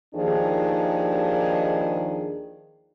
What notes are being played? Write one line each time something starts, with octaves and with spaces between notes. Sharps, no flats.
D#2 D#3 F3 D4 G#4